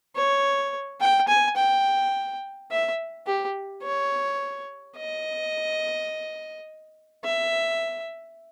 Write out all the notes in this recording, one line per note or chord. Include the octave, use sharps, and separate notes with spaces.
C#5
G5
G#5
G5
E5
G4
C#5
D#5
E5